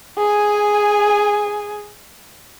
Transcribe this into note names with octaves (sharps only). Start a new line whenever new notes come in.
G#4 G#5